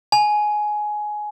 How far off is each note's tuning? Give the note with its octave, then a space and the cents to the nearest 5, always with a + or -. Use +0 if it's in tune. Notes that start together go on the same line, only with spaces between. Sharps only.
G#5 +15